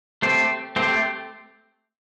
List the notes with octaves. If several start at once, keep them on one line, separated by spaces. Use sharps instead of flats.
A3 C4 G4 C5
A3 C4 G4 C5